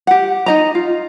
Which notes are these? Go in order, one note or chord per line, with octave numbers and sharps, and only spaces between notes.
G4 F#5
D#4 D#5 A#5
F4